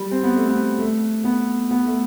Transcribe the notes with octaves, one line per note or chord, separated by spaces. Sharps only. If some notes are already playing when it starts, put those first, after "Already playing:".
Already playing: G3
C4
B3
A3
B3
A3
B3
B3
A3